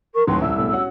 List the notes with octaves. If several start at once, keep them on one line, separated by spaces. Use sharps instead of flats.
A#4 C#6
D#1 A2 D#3 F#3 B4 G5 C6
C2 E4 E6
E1 E2 A2
C#4 F#4 F#5